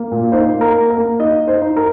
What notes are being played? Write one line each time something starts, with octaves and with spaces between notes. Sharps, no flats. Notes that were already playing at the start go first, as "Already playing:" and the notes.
Already playing: A#3
A#2
D#4 C5
A#3
A#4
A#3
A#4
A#3
D#4 D#5
D#4
C5
D#4
A#4